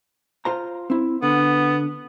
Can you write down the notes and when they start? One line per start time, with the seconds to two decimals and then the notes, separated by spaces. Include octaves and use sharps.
0.45 F4 C5 A#5
0.90 C4 E4
1.22 D3 B3